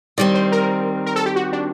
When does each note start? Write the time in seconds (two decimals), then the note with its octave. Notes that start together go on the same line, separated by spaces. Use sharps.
0.18 D#3 G3 C4 D5
0.35 C5
0.52 A#4
1.06 A#4
1.16 A4
1.26 G4
1.36 F#4
1.53 D4